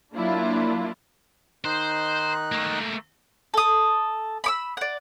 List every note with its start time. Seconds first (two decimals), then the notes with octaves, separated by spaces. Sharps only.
0.15 F#3 A#3 D4 E4 F4
1.65 D#3 D#4 C5 F#6
2.52 A3 A#3
3.54 A4 D#6
4.44 B5 D6 E6
4.77 D5 F#5